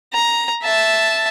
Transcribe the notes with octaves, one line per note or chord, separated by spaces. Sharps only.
A#5
E5 A5